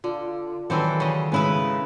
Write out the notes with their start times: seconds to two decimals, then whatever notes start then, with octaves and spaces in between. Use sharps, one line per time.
0.04 D3 F4
0.70 D#3 E3 F#3 G3 C4 A4
1.00 C#3 D#5
1.32 G#2 C#3 B3 D#4 E4 B4